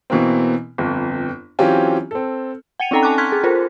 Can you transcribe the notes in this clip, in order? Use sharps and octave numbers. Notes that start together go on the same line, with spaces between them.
B2 E3 A#3 C4
G1 F2
E3 F#3 C4 C#4 F4 G4
C4 A4
F#5 G5 C#7 D#7 F7
C4 C#4 D#4 A4 G5 A#5
G#5 A5 C#6 D6 F#6
C6 F6 F#6 G#6 B6
G#4
F4 A4 A#4 C5